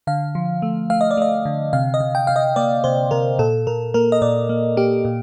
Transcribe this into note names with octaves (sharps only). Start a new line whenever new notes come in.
D3 F5
F3
A3
A3 F5
D#5
D5
A3 D#5
D3
C3 F5
D#5
C3
G5
C3 F5
D#5
A#3 D5
C3 C5
C3 A#4
A#2 A4
A#2 A#4
A#3 A#4
D#5
A#2 D5
A#3
A#3 G4
A#2